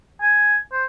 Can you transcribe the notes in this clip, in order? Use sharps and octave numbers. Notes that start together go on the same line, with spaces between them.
G#5
C5